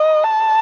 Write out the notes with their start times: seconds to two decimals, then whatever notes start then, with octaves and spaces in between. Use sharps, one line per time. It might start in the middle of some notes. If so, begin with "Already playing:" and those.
Already playing: D#5
0.24 A5